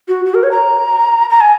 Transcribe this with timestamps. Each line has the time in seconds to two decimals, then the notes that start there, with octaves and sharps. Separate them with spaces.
0.08 F#4
0.25 F#4
0.34 A#4
0.43 C#5
0.51 A#5
1.30 A#5
1.40 G#5